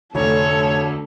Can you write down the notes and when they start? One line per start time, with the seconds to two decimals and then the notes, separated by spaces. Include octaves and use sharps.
0.15 F1 D2 A4 C#5